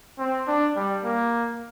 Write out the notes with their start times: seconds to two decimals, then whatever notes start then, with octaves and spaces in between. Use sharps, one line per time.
0.19 C4
0.47 D4
0.76 G3
1.04 A#3